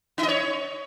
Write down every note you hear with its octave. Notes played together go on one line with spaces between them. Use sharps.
D#4
D#5
C#5